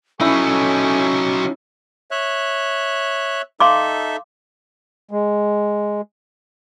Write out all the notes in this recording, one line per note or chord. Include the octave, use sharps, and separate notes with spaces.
F#3 C#4 D#4 E4 A4 G#5 C#6
C#5 E5 F#6
D#4 A4 E5 F5 C6 D6
G#3